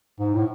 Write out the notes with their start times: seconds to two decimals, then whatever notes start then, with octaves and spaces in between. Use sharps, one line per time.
0.20 G#2
0.34 A2